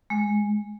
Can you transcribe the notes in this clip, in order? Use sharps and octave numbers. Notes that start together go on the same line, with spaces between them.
G#3